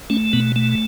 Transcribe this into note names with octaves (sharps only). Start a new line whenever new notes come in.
A3 C#4
B2 B3
A3